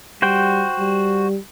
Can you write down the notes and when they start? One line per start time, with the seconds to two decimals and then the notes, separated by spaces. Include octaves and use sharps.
0.22 G3 F#4 C5 G5
0.79 G3